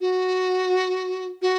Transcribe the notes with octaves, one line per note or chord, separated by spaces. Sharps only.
F#4
F#4